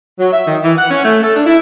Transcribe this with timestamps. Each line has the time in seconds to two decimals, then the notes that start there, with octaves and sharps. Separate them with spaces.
0.19 F#3
0.33 E5
0.47 D#3
0.63 E3
0.78 F#5
0.91 C#4
1.04 A3
1.22 A4
1.35 D4
1.47 E4